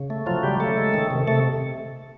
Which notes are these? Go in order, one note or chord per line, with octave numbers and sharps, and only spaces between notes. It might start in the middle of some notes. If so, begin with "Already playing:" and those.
Already playing: C#3
A3
F3 F#3 F4
C#3 G3 G4
C#3 A3 A4
G#3
D#3
C3
C3 A3 A4